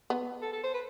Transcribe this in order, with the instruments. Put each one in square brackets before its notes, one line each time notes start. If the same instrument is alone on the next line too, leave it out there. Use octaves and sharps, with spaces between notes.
[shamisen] B3
[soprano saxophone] A4
A4
C5
B4